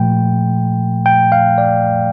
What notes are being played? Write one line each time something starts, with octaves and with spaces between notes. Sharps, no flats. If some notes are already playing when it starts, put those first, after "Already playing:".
Already playing: A#2 F3 A3 G5
G5
F5
D5